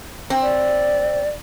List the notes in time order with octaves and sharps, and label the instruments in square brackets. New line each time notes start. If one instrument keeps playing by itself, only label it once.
[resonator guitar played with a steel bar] C4
[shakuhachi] D5